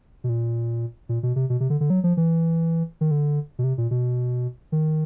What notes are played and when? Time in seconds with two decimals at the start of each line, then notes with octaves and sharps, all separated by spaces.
0.24 B2
0.29 A#2
1.09 A#2
1.23 B2
1.36 C3
1.50 B2
1.60 C3
1.70 D3
1.81 D3
1.90 F#3
2.04 F3
2.17 E3
3.01 D#3
3.11 D3
3.59 B2
3.64 C3
3.78 A#2
3.91 B2
4.72 D#3